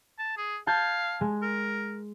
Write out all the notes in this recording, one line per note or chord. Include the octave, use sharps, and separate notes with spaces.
A5
G#4
F5 A5 G6 G#6
G#3
A#4